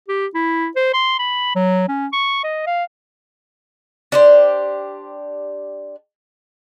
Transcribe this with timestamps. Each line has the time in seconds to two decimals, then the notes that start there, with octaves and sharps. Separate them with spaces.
0.08 G4
0.34 E4
0.76 C5
0.94 C6
1.19 B5
1.55 F#3
1.88 C#4
2.13 C#6
2.44 D#5
2.67 F5
4.12 D4 G4 C5